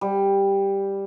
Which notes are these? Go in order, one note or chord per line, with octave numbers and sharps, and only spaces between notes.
G3